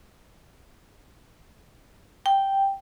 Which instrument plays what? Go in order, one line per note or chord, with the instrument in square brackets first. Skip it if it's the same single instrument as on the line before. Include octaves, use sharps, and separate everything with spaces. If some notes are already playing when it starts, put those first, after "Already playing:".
[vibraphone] G5